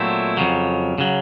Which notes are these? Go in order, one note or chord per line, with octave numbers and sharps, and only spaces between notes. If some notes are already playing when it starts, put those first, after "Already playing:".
Already playing: A#2 F#3 A3 C4 E4
F2 C#3 F#3
C#3 F#3